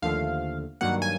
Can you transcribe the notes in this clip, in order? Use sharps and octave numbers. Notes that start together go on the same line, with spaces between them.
D#2 D3 F3 A3 F5
G2 D#3 F#3 A#3 F#5
G#5